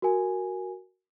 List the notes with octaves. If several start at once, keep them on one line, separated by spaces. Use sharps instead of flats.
F#4 A#4 G#5